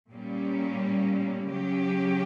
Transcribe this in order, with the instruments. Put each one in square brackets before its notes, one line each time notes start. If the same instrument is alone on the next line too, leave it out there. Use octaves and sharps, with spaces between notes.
[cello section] A#2 G3 A#3 C#4
C#3 F#3 C#4 G4